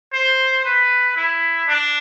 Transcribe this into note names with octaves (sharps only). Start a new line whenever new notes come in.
C5
B4
E4
D4